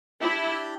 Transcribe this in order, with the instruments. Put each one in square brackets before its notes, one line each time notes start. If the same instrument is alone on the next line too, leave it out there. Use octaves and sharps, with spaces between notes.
[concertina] D4 G4 D5 G5 [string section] E4